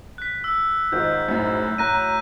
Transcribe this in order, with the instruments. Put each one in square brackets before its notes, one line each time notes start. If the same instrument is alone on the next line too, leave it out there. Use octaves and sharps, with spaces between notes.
[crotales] F#6 B6
E6
[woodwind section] G#2 [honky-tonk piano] D#3 F4 [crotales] G6
[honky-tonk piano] F#2 A2
[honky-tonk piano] A2 [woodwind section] F#3 A#5 [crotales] F#6 A#6 D#7